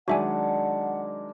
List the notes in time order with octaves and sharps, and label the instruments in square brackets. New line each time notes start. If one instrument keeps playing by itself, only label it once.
[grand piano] D#3 F#3 G#3 [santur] D4 [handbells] F#4 E5 G#5 [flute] F#5